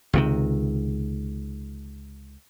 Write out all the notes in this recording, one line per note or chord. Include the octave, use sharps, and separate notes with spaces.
C#2 C3 D#3